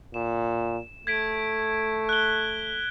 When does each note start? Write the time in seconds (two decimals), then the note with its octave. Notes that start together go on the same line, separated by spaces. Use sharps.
0.14 A#2 E7
1.07 A3 G#6 B6 D7
2.09 F#6 G7